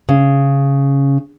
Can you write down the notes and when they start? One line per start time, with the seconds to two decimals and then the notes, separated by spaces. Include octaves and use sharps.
0.09 C#3